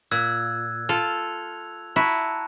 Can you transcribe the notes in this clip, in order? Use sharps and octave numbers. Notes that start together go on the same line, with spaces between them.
A#2 E6 F#6 G#6
F4 A4 F7
E4 F#4 A5 A#5